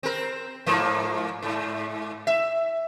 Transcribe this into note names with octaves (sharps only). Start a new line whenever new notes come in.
C4 A#4
G#2 F3 A#3
G#2
E5